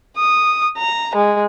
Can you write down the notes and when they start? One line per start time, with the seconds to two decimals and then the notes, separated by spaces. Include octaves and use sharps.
0.18 D#6
0.78 A#5
1.16 G#3